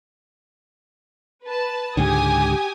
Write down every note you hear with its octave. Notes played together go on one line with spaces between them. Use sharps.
B4 A5
C#2 G#2 D3 G4 G#5 D#6